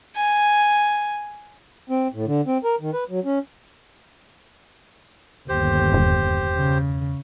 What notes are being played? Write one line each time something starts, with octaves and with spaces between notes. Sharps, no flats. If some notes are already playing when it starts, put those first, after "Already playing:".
G#5
C4
A2
D3
C4
A#4
D#3
B4
F#3
C#4
G1 D#2 G4 C5
E1
C#3